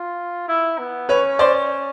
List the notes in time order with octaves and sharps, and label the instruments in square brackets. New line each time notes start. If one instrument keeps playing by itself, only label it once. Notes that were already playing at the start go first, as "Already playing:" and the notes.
Already playing: [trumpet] F4
E4
B3
[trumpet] C#4 [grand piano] B4 C#5
[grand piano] C5 D5